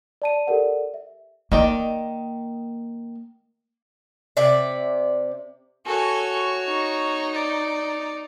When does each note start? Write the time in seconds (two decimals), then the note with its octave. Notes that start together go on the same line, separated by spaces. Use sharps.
0.22 D5 A5 D#7
0.47 G4 A4 A#4 D5 F#5
0.94 E5
1.52 D#3 A#3 D#4 D5
4.37 C3 D5 E5
5.85 F#4 A4 C#5 G#5
6.65 D#4
7.34 D5